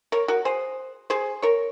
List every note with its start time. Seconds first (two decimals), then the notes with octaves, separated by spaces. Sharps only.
0.12 A#4 C#5
0.28 F#4 A#4
0.45 G#4 C5
1.10 G#4 C5
1.42 A#4 C#5